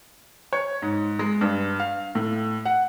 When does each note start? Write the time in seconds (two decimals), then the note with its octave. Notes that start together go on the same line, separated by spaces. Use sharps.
0.53 C#5
0.82 G#2
1.19 G#3
1.41 G2
1.80 F5
2.15 A2
2.65 F#5